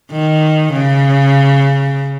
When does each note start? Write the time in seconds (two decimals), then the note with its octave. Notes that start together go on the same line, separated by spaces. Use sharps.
0.11 D#3
0.73 C#3